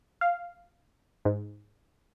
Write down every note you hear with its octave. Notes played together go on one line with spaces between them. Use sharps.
F5
G#2